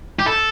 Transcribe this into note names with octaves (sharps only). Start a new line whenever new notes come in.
G4
A4